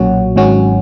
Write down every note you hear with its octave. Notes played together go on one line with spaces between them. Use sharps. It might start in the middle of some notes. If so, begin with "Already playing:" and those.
Already playing: B1 A#2 F#3 C#4 F#4
G#1 G#2 F#3 C#4 F#4